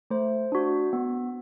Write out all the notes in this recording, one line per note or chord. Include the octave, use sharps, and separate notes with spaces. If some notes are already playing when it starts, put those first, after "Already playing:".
A3 C5
D4 F#4
B3